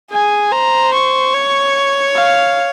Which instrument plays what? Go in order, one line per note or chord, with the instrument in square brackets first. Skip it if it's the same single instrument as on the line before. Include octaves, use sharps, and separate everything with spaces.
[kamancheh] G#4 [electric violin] G#5
[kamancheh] C5 [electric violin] A#5
[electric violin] C#6
[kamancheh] C#5
[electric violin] F5